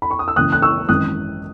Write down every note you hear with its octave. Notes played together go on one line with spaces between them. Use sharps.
B5
C#6
D#6
E6
C#2 C#3 E3 A#3 D#6 F#6
F#6
C#6 E6
G#1 F#2 E3 D#6 F#6